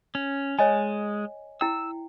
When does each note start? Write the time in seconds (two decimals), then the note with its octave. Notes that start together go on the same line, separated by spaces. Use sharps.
0.15 C#4
0.59 G#3 C#5 D#5 G#5
1.61 E4 G5 E6